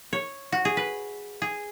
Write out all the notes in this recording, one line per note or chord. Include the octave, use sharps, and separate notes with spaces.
C#5
F#4
G#4
B4
G#4